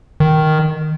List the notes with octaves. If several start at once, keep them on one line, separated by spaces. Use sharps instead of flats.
D#3